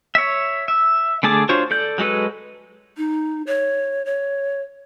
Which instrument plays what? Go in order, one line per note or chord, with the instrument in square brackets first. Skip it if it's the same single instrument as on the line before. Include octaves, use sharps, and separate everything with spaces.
[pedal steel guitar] C#5 E5
E5
D3 A3 G#4 A5 D6
D4 F4 F#4 C5 C#5
A4 D5 G6
F#3 G#3 F#4 A4 B4
[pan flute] D#4
C#5
C#5